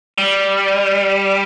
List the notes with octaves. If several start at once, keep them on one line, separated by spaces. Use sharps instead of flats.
G3